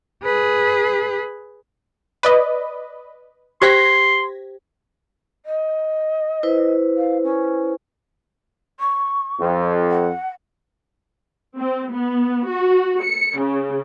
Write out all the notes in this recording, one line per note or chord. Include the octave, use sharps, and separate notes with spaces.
G#4 B4
B4 D5 D#5
G4 C5 G5 C6 G#6 A#6 B6
D#5
E4 B4 C5
F5
C#4
C#6
F2
F#5
C4
B3
F#4
C#7
C#3